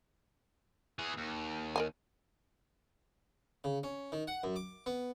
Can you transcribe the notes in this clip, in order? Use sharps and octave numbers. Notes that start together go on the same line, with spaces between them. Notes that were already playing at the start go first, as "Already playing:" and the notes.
E3 G#4
D#2
A#4 D#5 G#5
C#3
C#4
D#3
F#5
F#2
D6
B3